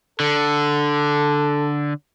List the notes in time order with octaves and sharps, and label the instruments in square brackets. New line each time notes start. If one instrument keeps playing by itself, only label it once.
[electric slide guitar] D3 [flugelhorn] A4